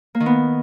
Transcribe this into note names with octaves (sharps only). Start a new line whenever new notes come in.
A#3
D#3
B3